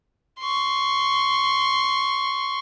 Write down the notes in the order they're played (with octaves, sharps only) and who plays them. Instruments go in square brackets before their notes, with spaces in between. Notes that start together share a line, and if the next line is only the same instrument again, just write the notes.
[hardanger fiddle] C6 C#6